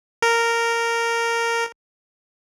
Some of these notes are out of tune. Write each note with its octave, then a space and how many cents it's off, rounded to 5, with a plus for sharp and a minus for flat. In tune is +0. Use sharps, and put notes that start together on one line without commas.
A#4 -10